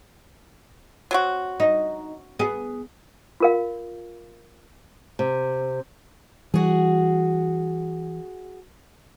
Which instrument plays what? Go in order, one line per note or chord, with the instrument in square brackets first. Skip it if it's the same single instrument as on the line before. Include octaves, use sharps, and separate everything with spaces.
[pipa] F#3 C4 F#4
[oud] D#4
B3 G#4
[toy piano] F4 A#4 F5
[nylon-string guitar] C3
[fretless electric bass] E3 G3 [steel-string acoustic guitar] F#4 G#4